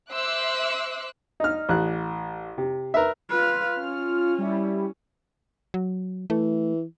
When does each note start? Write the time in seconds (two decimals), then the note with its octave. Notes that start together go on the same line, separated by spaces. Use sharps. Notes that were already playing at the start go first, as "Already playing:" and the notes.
0.11 C5 E5 C6 D6 E6 F#6
1.40 D#4 F6
1.69 A1 F#6
2.58 C3
2.94 A#4 B4 E5
3.30 F4 B4 F6
3.79 C#4
4.38 G3 E4
5.74 F#3
6.30 E3 A3